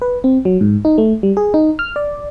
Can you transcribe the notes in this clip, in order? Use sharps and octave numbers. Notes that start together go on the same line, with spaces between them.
B4
C4
F#3
G#2
D#4
A3
G3
G#4
D#4
F6
D5